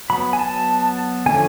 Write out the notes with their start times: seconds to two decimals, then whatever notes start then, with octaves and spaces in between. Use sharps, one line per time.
0.10 F#3 B3 B5
0.33 G#5
0.39 A5
1.26 D3 F3 A3 C#4 G#5